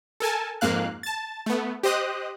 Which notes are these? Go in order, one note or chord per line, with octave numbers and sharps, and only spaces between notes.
A4 A#4 G#5 A5
F2 G#2 A#3 F5 F#6
A5 A6
A3 B3
G4 C5 D#5 D#6 F#6